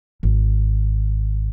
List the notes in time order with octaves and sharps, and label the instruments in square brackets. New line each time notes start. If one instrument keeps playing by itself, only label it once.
[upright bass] G#1